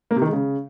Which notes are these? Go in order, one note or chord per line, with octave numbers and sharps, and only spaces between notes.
A#3
C3
D#3
G#3
C#3